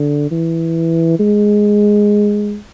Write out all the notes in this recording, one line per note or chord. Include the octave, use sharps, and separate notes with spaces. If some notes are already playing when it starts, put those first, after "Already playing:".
Already playing: D3
E3
G#3